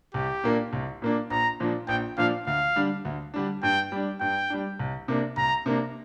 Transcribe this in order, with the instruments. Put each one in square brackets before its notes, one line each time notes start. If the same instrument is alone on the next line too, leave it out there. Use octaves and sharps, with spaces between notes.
[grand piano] C2 [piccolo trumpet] G4
[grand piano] A#2 A#3 D4
C2
A#2 A#3 D4
[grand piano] A#1 [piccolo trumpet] A#5
[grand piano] A#2 F3 D4
[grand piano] A#1 [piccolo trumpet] G5
[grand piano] A#2 F3 D4 [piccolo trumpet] F5
[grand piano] D2 [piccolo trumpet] F5
[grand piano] D3 G3 D4
D2
D3 G3 D4
[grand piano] G2 [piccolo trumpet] G5
[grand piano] G3 D4
[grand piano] G2 [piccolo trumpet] G5
[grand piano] G3 D4
C2
C3 A#3 D4
[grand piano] C2 [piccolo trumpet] A#5
[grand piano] C3 A#3 D4